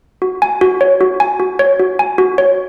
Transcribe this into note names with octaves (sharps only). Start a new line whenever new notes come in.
F#4
G#5
F#4
C#5
F#4
G#5
F#4
C#5
F#4
G#5
F#4
C#5